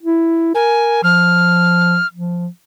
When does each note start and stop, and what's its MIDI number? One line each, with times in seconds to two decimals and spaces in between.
0.03 0.50 64
0.55 1.01 70
0.55 1.02 80
1.04 1.98 53
1.04 2.07 89
2.14 2.47 53